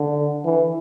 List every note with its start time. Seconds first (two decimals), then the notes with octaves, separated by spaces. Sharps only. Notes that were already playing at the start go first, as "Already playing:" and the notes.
Already playing: D3
0.45 E3